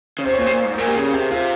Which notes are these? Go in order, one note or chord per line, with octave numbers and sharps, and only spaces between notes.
C#3
C3 C5
C#5
A#2 C5
C3
A#2
G#2
C5
A#2 A#4
G4
C#3 G#4
C3 G4
C3 F4